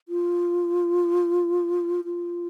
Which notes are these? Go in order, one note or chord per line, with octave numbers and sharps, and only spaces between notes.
F4
F4